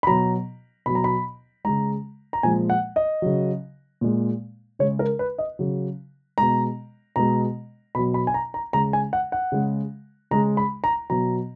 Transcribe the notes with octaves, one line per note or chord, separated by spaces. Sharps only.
B5
B2 F#3 A#5
B2 F#3 B5
A#5
B5
C#3 G#3 A#5
A#5
A#2 F3 G#3 G#5
F#5
D#5
C#3 F#3
A#2 G#3
C#3 G#3 C#5
A#4
B4
D#5
C#3 F#3
B2 G#3 A#5
B2 G#3 A#5
B2 F#3 B5
B5
G#5
A#5
A#5
C#3 G#3 A#5
G#5
F#5
F#5
C#3 G#3
C#3 G#3 A#5
B5
A#5
B2 F#3 A#5